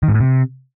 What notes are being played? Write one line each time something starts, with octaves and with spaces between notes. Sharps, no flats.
D#3
G#2
A2
C3